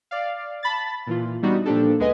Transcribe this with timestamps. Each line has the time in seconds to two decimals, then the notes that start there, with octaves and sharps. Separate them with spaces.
0.11 D5 F5
0.63 A5 B5 A6
1.07 A#2 E3 F4
1.42 E3 G3 B3 D4 D#4 F#4
1.65 A#2 F3 A#3 D4 G4 A4
1.99 D2 G#3 B3 B4 D#5 G#5